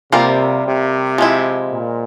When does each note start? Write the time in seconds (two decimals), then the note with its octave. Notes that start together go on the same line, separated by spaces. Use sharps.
0.12 C3 G3 A#3 F4 A#4
0.65 C3
1.18 F3 G#3 E4
1.72 A#2